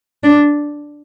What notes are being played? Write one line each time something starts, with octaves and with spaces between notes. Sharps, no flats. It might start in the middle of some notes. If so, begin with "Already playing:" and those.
D4